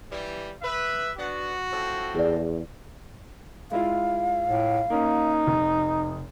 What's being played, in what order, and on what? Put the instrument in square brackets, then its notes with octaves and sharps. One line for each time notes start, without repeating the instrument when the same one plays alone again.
[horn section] E3 G3
[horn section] B4 [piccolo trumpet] E5
[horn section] B3 D4 F#5 [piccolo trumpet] F#4
[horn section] A2 F3 C4
[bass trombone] E2 [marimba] G#4 D5
[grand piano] G#3 E4 F4 [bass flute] F5
[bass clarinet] A2
[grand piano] A#3 C#4 [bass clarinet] D#4
[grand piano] F1